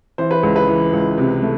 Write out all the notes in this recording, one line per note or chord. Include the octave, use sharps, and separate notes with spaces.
E3 C5
B4
C#2
B4
E3
C#2
C3
A3